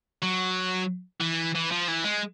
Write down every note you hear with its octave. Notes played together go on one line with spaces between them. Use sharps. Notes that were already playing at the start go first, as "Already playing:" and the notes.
F#3
E3
E3
F3
E3
G#3